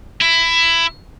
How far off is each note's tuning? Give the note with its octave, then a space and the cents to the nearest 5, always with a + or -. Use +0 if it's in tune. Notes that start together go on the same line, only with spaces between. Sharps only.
E4 +15